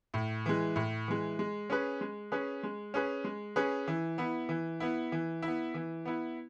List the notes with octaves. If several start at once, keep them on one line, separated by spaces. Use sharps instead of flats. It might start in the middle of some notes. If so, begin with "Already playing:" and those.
A2
E3 G#3
A2
E3 G#3
G#3
C#4 G#4 B4
G#3
C#4 G#4 B4
G#3
C#4 G#4 B4
G#3
C#4 G#4 B4
E3
B3 E4
E3
B3 E4
E3
E4
B3
E3
B3 E4